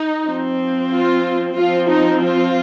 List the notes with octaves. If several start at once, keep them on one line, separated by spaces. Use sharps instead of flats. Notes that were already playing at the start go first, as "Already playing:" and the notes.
Already playing: D#4
F3 C4
F4
F3 C4 F4
D#4
F4